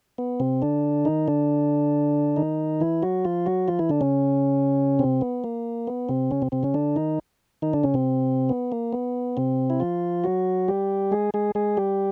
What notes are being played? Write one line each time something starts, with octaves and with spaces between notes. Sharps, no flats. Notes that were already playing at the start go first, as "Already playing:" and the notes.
B3
C3 C4
D3 D4
D#3 D#4
D3 D4
D#3 D#4
E3 E4
F#3 F#4
F3 F4
F#3 F#4
F3 F4
E3 E4
D3 D4
C#3 C#4
C3 C4
B3
A#3
B3
C3 C4
C#3 C#4
C3 C4
C3 C4
C#3 C#4
D3 D4
D#3 D#4
D#3 D#4
D3 D4
C#3 C#4
C3 C4
B3
A#3
B3
C3 C4
E4
F3 F4
F#3 F#4
G3 G4
G#3 G#4
G#3 G#4
G#3 G#4
G3 G4